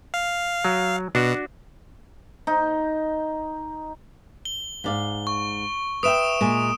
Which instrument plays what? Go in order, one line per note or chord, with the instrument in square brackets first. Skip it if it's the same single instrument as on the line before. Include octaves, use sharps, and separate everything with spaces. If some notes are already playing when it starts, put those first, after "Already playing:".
[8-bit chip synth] F5
[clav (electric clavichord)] F#3
[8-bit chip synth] B2 [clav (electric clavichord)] D4 F#4
[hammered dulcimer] D#4
[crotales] G7
[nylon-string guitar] G#2 D5 F5
[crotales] C#6
[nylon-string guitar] B4 E5 G5 [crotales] D#6 D7 E7
[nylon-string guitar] A#2 G#3 G#5